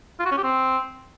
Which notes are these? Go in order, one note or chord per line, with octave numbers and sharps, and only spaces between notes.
F4
F#4
C#4
G4
C4